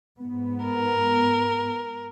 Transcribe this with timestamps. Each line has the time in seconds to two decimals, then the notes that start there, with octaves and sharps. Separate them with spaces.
0.20 G#2 B3
0.65 A#4